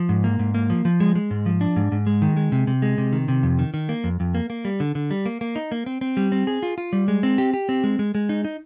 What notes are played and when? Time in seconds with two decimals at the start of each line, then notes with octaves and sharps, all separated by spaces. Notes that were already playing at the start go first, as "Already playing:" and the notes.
Already playing: F3
0.09 G#2
0.24 A#3
0.39 G#2
0.54 A#3
0.70 F3
0.85 F3
1.00 G#3
1.15 G#3
1.31 G#2
1.46 F3
1.61 D4
1.76 G#2
1.92 G#2
2.07 G#3
2.22 D#3
2.37 G#3
2.52 C3
2.67 C3
2.82 G#3
2.98 C3
3.13 D#3
3.28 C3
3.43 F2
3.59 D#3
3.74 D#3
3.89 A#3
4.04 F2
4.20 F2
4.35 A#3
4.50 A#3
4.65 G3
4.80 D3
4.95 D3
5.11 G3
5.26 A#3
5.41 A#3
5.56 D#4
5.72 A#3
5.86 C4
6.01 C4
6.17 G3
6.32 C4
6.47 G#4
6.63 F4
6.78 F4
6.93 G3
7.08 G#3
7.23 C4
7.38 G4
7.54 G4
7.69 C4
7.84 G#3
7.99 G#3
8.15 G#3
8.29 D#4
8.44 D#4